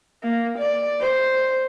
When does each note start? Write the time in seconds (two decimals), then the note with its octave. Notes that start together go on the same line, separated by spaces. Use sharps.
0.23 A#3
0.58 D5
1.00 C5